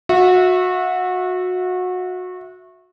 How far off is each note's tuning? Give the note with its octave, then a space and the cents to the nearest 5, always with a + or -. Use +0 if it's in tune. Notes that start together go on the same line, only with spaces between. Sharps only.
F#4 -25 E5 +0